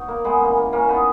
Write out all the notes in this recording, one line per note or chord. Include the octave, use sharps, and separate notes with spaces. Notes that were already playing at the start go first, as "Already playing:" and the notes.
Already playing: B2 F#3 D#4
A#3
G#3 B3
C#3 E3 A#3
A#3
A#3 C#4
B3 D#4